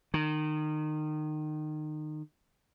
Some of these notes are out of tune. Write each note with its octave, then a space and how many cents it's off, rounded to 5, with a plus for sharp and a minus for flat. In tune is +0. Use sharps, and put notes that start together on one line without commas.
D#3 -25